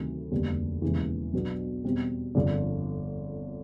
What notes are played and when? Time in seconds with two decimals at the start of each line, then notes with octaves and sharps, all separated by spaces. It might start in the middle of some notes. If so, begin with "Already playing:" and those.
Already playing: D2 C3 D#3 F#3
0.31 F1 D#2 D3 G3 B3
0.82 E1 D#2 C#3 E3
1.34 B1 B2 F#3 B3 D4
1.84 E2 B2 G3 C4
2.35 G1 F2 D3